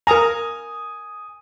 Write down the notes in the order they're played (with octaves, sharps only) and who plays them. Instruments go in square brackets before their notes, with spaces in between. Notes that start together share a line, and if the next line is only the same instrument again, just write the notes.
[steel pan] A#4 A#5 [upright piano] G#5 D#6